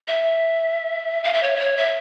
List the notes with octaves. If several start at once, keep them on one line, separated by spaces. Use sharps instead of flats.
E5
F5
E5
C#5
E5
C#5
E5